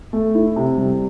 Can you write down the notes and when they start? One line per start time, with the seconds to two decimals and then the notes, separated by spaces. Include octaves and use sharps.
0.13 A3
0.35 E4
0.56 C3
0.78 G3